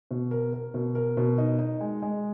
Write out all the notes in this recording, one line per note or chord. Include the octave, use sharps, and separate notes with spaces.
B2
A#4
A#4
B2
A#4
B2
D#4
D#4
G#3
G#3